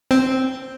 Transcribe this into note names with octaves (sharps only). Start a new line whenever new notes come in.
C4